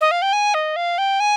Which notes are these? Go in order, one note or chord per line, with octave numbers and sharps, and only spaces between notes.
D#5
F5
G5
G#5
D#5
F5
G5
G#5